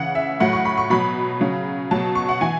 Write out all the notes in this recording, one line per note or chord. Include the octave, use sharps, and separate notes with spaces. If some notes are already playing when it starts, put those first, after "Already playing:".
Already playing: C#3 E3 F#5
E5
A2 F#3 F#5
C#6
B5
C#6
B2 F#3 B5
C#3 F#3
B2 F#3 A5
C#6
F#5
E3 G#5